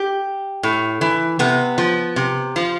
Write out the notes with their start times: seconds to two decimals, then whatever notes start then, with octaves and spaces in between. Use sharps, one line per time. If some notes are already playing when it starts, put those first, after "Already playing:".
Already playing: G4
0.63 A2
1.01 E3
1.39 C3 B3
1.78 F3
2.16 C3
2.56 F3